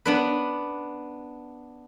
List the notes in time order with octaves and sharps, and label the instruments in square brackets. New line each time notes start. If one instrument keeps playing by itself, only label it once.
[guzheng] B3 D4 B4